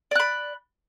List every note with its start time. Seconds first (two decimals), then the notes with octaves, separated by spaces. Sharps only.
0.11 D5
0.15 F#6
0.20 B5